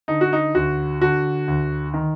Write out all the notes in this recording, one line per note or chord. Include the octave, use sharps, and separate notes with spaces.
D3 D#4
F#4
D#4
D2 F#4
D3 F#4
D2
D#3